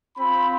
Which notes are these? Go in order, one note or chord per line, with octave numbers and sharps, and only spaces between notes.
C4 F4 B5